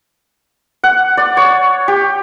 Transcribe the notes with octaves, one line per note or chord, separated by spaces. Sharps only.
F#5
D5
C#5
G4